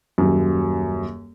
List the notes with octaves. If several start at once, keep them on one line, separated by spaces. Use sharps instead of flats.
D#1 F#2